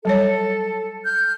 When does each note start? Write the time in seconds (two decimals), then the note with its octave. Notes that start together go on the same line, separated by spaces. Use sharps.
0.05 F#3 G3 A4 C#5
1.04 F6 G6